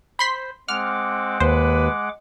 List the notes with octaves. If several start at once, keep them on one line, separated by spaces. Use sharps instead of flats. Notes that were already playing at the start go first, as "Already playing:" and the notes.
C5 B5 C6 B6
G#3 C4 F#5 D6 F6
D#2 B4 C5